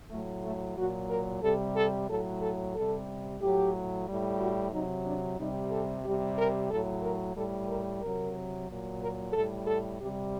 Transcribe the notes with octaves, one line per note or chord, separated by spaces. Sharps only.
A2 F#3 A3
A3
A#2 F#3 F#4
A#4
C3 G3 A4
A4
A2 F#3 A4
A4
C3 G3 A4
A2 F#3 G4
A2 G3
F#4
C3 F#3 D#4
D4
C3 G3 D#4
A4
C3 G3 G4
A#4
A2 F#3 A4
A#4
A2 G3 A4
A#4
C3 F#3 A#4
A#2 F#3
A#4
A2 G3 A4
A4
C3 G3 G4